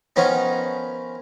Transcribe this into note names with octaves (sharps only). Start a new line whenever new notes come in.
D#3 F3 B3 C#4 D#4